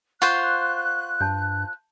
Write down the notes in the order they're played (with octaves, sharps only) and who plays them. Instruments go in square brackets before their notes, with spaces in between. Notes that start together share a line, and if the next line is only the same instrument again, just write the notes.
[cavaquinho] F4 C5 [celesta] F#5 C#6 [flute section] F#6
[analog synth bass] G2 [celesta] A5 G6